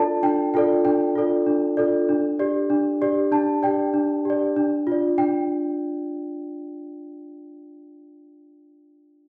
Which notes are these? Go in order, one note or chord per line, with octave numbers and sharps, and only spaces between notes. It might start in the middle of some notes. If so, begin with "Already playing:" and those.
Already playing: D4 F4 A4 D5 A5
D4 G5
F4 A4 D5 G5
D4 G5
F4 A4 D5
D4
F4 A4 D5
D4
G4 D5
D4
G4 D5
D4 A5
G4 D5 G5
D4
G4 D5
D4
F4 D5
D4 G5